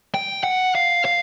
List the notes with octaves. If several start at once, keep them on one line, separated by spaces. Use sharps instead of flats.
G5
F#5
F5
F5